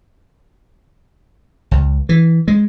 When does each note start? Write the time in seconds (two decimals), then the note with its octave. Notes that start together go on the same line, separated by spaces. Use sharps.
1.71 C#2
2.09 E3
2.48 G#3